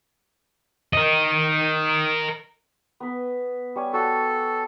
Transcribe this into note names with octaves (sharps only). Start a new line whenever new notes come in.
A#4 D#5
B3 B4
G3 C#5 G#5
F#4 A4